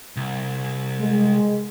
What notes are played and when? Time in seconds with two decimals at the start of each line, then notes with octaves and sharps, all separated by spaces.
0.16 C2
1.01 G#3